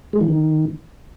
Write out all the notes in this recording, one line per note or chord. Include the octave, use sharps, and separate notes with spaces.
G#3
E3
D#3